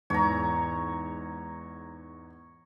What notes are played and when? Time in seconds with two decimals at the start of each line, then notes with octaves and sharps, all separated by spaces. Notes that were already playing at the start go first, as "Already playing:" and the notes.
0.10 E2 G#2 C#5 A#5